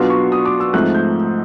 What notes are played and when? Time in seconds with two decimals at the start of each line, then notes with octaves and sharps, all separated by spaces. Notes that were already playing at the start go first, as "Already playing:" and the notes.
Already playing: B2 F#3 B3 D4 F4 C6
0.10 C#6
0.32 D#6
0.45 D6
0.60 E6
0.73 G#2 F3 A3 C4 F#6
0.95 G6